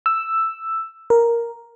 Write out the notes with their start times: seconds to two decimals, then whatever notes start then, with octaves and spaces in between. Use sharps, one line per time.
0.06 E6
1.10 A#4